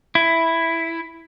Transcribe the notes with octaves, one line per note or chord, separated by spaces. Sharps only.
E4